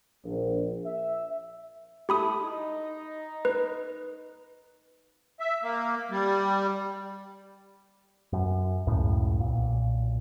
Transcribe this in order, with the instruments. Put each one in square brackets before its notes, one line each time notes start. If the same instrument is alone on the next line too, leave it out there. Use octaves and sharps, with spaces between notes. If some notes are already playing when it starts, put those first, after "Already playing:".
[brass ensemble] A#1
E5
[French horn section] A3 E4 A4 [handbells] G4 B5 D#6
[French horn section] D#4
[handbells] B4
[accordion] E5
A#3
G3
[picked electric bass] F#2
C#2 F#2 A2 C#3
B1 A#2